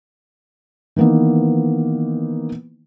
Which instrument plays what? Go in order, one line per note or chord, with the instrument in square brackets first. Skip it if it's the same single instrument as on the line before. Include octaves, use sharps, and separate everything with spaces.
[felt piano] D#3 E3 A#3 B3 D#4